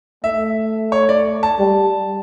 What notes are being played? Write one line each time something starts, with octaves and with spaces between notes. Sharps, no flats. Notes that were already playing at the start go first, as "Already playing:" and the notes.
A3 E5
C#5
D5
A5
G3